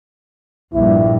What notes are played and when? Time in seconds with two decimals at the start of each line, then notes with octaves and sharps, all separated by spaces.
0.74 A#1 G2 E4